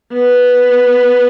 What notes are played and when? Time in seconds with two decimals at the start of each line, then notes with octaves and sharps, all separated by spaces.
0.13 B3